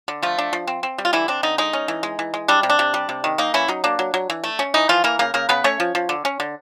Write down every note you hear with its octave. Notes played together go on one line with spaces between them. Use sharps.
D3
F3 A3 F4
D4
F3
C4
C4
G3
F4
D3 E3 E4
C4 D4
D3 D#4
G#3 D#4
C#4
E3
G#3
E3
G#3
G3 D4
C3
D4
C3
G3
C3
D#3
A#3 D#4
E3 C#4 E4
F#3 D#4
A#3 D4
F#3
F#3
E3
A3
C#4
E3 D#4
E3 F3 F4
E3 A#3 A#4
C#3 A#3 A#4
C#3 A#3 A#4
C#3 B3 B4
A3 C#4 C#5
F3
F3
D3
C#4
D3